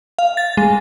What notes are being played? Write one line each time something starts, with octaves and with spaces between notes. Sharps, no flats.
F5
A6
G#3